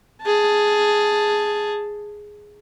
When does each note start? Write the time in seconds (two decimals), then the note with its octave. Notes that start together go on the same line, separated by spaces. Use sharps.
0.23 G#4 A5